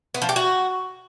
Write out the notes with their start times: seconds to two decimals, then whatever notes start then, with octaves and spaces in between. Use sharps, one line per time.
0.14 B3
0.22 F3
0.29 G4
0.36 F#4